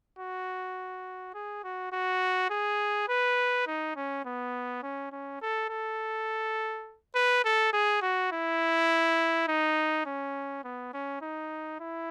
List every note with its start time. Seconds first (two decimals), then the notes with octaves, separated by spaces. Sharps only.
0.19 F#4
1.34 G#4
1.64 F#4
1.92 F#4
2.50 G#4
3.09 B4
3.67 D#4
3.96 C#4
4.25 B3
4.83 C#4
5.12 C#4
5.42 A4
5.70 A4
7.15 B4
7.45 A4
7.73 G#4
8.02 F#4
8.32 E4
9.48 D#4
10.06 C#4
10.64 B3
10.93 C#4
11.22 D#4
11.81 E4